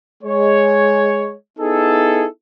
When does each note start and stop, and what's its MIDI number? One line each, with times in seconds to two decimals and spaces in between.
0.24 1.33 56
0.24 1.33 73
1.60 2.26 59
1.60 2.26 63
1.60 2.26 64
1.60 2.26 68
1.60 2.26 69